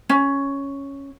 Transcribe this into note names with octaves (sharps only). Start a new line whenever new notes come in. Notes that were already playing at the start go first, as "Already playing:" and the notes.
C#4